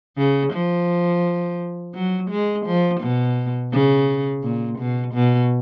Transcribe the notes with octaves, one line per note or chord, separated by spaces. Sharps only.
C#3
F3
F#3
G#3
F3
B2
C#3
A#2
B2
B2